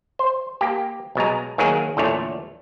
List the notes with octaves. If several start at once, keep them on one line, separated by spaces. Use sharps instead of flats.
C5
A#3 G4
B1 B2 G#3 A#5
D#3 F#3 A#3 F#4 G#4 A#4
E2 A#2 D3 A3 C#5